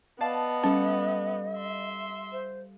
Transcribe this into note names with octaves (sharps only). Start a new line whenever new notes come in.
B3 D5 D#5 F5 A5
G3 C#4 A4
E5 C6
C5